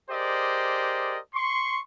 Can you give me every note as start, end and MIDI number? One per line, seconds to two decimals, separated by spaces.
0.10 1.18 67
0.10 1.18 68
0.10 1.18 70
0.10 1.18 72
0.10 1.18 74
0.10 1.18 75
1.34 1.80 84
1.34 1.80 85